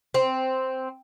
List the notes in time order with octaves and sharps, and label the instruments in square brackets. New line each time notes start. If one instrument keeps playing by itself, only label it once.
[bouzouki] C4